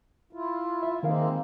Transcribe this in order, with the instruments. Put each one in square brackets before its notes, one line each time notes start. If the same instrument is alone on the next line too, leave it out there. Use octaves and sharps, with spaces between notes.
[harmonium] E4 F4
[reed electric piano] E5
[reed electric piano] D#3 A#4 F5 [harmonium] G#3 A#3 C4